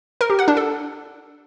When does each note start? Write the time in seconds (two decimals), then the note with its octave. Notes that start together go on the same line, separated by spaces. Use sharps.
0.21 A#4
0.30 G4
0.39 F#5
0.48 D4
0.57 A4